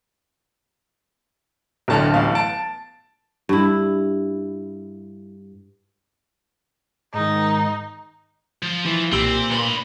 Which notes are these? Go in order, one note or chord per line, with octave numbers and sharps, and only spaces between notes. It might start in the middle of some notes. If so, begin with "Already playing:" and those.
D1 B2 D3 A5 F6
A1 B3 F5
A5 A6 D7
G2 E4
G#2 D#3 D#4
F3
E3
B1 A#2 C4 G4 E6
D3 B4 B5